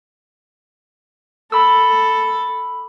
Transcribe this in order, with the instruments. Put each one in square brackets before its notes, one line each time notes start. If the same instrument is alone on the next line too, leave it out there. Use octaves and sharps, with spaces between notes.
[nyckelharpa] A4 [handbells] B5 D6 E6